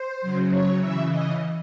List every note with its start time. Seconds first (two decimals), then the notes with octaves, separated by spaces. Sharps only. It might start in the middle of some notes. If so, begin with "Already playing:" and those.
Already playing: C5
0.22 C#3 F#3
0.51 C#5
0.80 C#3 E3 E5
1.09 D#5